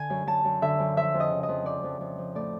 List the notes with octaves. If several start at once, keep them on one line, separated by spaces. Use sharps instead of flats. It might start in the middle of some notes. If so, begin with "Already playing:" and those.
Already playing: D3 G#5
F#2
F#2 A5
F#2
D3 E5
F#2
F3 E5
F2
D#5
C#3
D#5
F2
F3 D5
F2
F2
F3
A2 D5